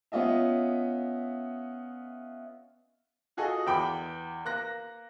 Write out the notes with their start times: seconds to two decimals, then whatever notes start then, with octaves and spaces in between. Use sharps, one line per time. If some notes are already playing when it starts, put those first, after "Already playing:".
0.12 B3 C#4 F4 D#5 E5
3.37 F4 F#4 G#4 A4 D#5
3.67 E2 G5 B5 D6
4.45 A#3 F#6 A#6